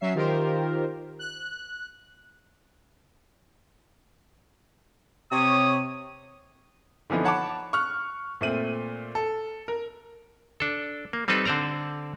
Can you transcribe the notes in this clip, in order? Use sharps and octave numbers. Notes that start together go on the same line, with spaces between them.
F#3 C#4 E5 C7
D#3 F4 G4 A#4 C5
F#6
C3 C#5 D#6
D3 E3 F3 B3 D#4
C#5 F#5 A5 B5 D6
C#6 F6 F#6
A#2 A3 C4 D#7 F#7
A4
A#4
D4 A4
A#3
G3 C4 D#4 A4 B4
D3 C4 C5 D5 A#5